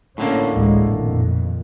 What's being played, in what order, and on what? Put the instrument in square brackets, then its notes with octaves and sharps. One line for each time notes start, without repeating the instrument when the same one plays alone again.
[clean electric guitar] A2 D3 A#3 [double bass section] C#4
[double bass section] A1 D2 G#3
F2 A#2 D#3